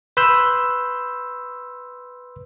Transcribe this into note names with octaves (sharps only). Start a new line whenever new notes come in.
B4 B5 C6 E6 G6